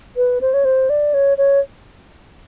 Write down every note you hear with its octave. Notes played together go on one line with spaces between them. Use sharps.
B4
C5
C#5
C5
D5
C#5
C#5